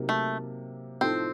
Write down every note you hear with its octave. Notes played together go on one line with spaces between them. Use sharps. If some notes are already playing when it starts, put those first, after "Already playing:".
Already playing: C3 F#3 A#3 D#4
A3
A2 F3 A3 C4 D#4 A4